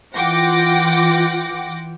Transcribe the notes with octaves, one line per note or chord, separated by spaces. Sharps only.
E3 F4 F#5 G5 D6 A#6